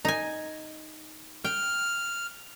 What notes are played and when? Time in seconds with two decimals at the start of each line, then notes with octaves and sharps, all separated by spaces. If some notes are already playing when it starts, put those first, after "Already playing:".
0.05 D#4 G#5
1.45 G5 F6